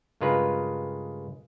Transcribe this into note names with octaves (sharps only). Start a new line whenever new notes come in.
G2 C#3 G#3 F4 A#4 B4